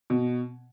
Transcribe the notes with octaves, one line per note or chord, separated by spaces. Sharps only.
B2